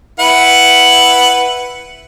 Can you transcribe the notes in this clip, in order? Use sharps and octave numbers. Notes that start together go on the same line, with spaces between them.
E4 B4 F#5